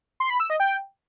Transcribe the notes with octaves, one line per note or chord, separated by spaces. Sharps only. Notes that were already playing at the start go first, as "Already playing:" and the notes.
C6
B5
E6
D#5
G5